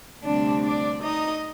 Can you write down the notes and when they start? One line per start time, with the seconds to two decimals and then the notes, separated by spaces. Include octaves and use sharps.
0.23 D2 C3 G3 C4 D4 D5
0.63 D4 D5
1.03 D#4 D#5